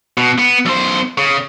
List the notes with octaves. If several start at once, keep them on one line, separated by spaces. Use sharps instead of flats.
B2
B3
B1 C5
C#3